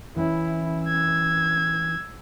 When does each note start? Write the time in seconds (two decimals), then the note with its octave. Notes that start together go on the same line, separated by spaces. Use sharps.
0.16 E3 C#4 E4
0.85 E6 G#6